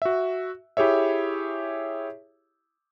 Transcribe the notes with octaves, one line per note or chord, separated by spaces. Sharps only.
F#4 E5
E4 G4 G#4 C#5 E5